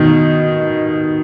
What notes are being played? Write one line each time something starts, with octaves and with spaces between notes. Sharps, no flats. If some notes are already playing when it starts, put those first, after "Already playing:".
Already playing: B2 D#3